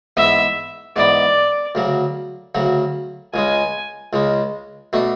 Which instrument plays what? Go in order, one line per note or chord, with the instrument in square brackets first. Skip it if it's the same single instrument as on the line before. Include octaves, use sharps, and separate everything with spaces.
[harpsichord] G#2 E3 B3 [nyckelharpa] E5
[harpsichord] G#2 E3 B3 [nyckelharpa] D5
[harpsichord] D2 C#3 F#3
D2 C#3 F#3
[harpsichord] C#2 C#3 G#3 [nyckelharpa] G#5
[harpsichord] C#2 C#3 G#3
B2 A3 D4